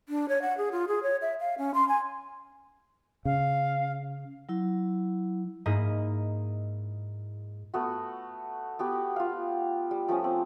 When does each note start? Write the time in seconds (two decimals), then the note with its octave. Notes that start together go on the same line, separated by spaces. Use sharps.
0.09 D4
0.29 C#5
0.42 F#5
0.58 G#4
0.72 F4
0.88 G#4
1.03 C#5
1.22 E5
1.40 F5
1.58 C#4
1.74 C6
1.88 G#5
3.25 C#3 F5
4.49 F#3 E4
5.66 G#2 A#3 E4 D#5
7.74 A3 B3 F#4
8.79 B3 F#4 G4
9.16 F4 F5
9.91 G3
10.08 F3 A3 C#4 D#6
10.24 C4